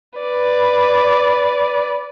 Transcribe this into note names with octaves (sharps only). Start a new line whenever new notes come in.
B4 D5